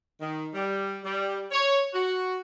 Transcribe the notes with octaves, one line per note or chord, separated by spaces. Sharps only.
D#3
G3
G3
C#5
F#4